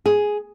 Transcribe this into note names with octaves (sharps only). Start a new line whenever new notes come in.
G#4